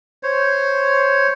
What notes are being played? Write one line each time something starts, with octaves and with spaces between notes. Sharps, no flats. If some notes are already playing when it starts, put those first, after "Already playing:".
C5 C#5